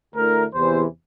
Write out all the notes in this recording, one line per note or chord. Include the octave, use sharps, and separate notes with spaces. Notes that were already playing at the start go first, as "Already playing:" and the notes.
D2 D3 A3 E4 A#4
E2 C3 E3 C5